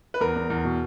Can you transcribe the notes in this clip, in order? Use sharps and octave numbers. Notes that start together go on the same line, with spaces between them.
B4
E2 A#4
E2
E2
B2